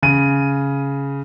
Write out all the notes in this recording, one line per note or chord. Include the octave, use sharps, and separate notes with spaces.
C#3 D#7